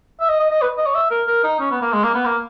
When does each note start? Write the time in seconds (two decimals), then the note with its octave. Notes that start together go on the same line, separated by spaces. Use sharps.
0.20 E5
0.29 D#5
0.40 D#5
0.51 D#5
0.62 B4
0.78 D#5
0.86 C#5
0.95 E5
1.11 A#4
1.27 A#4
1.44 D#4
1.60 C#4
1.71 B3
1.82 A#3
1.93 G#3
2.03 A#3
2.15 B3
2.25 A#3